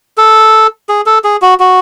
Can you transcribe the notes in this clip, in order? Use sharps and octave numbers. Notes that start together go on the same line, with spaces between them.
A4
G#4
A4
G#4
F#4
F#4